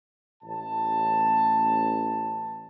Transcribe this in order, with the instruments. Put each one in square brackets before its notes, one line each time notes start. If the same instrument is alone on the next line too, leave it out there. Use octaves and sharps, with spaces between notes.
[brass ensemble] A1 A5